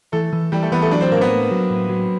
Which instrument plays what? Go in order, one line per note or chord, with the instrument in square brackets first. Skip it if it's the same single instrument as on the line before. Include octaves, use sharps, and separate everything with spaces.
[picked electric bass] E3 [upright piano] A3 A4
[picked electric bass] E3
[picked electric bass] E3 [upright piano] G3 G4
[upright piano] A3 A4
[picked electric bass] E3 [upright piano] B3 B4
[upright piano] A3 A4
[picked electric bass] F#3 [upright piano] D4 D5
[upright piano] C4 C5
[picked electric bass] A2 [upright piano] A#3 A#4
[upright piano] B3 B4
[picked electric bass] A3
F#3
A2
F#3